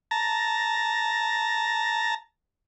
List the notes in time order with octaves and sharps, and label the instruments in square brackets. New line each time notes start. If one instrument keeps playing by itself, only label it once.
[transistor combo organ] A5 A#5